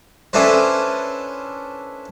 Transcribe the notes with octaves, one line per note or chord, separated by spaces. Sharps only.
C#4 D4 E4 A4 B4 C5